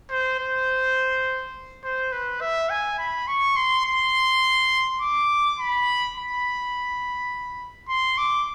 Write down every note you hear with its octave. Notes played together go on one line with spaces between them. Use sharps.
C5
C5
C5
B4
E5
G#5
B5
C#6
C6
C6
D6
B5
B5
C6
D6